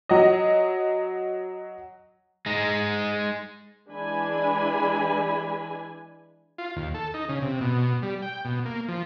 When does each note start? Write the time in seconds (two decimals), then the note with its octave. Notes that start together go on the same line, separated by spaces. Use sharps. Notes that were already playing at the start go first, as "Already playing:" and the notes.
0.09 F#3 D#5
2.46 G#3 D#4
3.90 E3 G#3 D4 G#5 B5
6.58 F4
6.76 D#2
6.94 A4
7.14 D#4
7.29 C#3
7.42 C3
7.61 B2
8.02 G3
8.22 G5
8.45 B2
8.65 A#3
8.88 F3